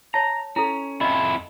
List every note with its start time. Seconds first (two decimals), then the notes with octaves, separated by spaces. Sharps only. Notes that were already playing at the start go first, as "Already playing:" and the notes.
0.14 C#5 A5 A#5
0.56 C#4 E4 A4
1.01 F2 E4 D#5